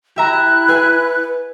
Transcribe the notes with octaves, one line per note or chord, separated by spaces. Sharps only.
E4 G4 E5 A#5 F#6
G#4 B4 G#5